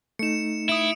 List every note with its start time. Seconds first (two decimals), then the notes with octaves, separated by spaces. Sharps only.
0.19 A3 D#4 C#7 E7
0.69 E4 D#6 D7